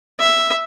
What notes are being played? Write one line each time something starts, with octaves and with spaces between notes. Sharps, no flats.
E5